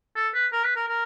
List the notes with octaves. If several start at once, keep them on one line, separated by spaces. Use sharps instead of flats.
A4
B4
A#4
B4
A#4
A#4